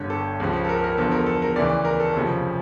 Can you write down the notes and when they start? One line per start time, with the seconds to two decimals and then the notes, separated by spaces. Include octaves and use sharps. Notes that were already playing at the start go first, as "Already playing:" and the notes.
Already playing: G1 G2 D3 C#5
0.10 A4
0.40 C#2 C#3 F3
0.65 A4
0.69 A#4
0.84 A#4
0.98 E2 D3 F3 A4
1.12 A#4
1.26 A4
1.42 A#4
1.56 D2 C#3 E3 D5
1.85 A#4
2.00 A4
2.14 F1 F2 C#3 F3